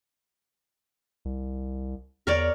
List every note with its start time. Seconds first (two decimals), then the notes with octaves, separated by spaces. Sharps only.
1.25 C2
2.27 E2 A#4 C#5 D5